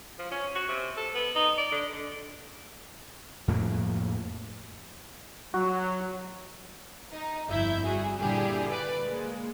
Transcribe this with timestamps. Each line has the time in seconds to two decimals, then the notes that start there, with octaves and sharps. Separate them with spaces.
0.19 F3
0.31 C#4
0.55 F#4
0.68 C3
0.97 A4
1.15 B3
1.35 D#4
1.58 D5
1.71 D3
1.93 D3
3.48 F2 A2 F3 A#3
5.54 F#3 F#4
7.12 D#4
7.47 G1 F2 E4 E5 G6
7.84 G3 F#4 G#4
8.17 A#2 D3 G3 E4 G4 G#4
8.69 B4 D5
9.04 G#3 A#3